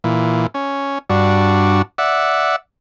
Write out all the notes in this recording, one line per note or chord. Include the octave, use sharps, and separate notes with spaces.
A#2 E3
C#4
G2 D4 F#4
D5 E5 F#5